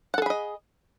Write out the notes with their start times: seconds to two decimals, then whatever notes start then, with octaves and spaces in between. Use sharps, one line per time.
0.14 F#5
0.18 A4
0.22 G#4
0.26 B5
0.30 D#5